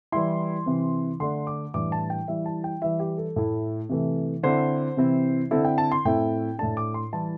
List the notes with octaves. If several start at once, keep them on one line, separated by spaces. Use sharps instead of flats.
E3 G3 E4 C6
C3 E3 C4
D3 A3 D4 C6
D6
A2 E3 G3 D4 D6
A5
G5
E3 G3 E4 E5
A5
G5
E3 G3 E4 E5
G4
A4
A2 A3 E4
C3 E3 A3
D3 C4 E4 C5
C3 E3 C4 E4
D3 C4 E4 A4
G5
A5
C6
A2 A3 C4 E4 G5
A2 A3 D4 A5
D6
C6
E3 G3 E4 A5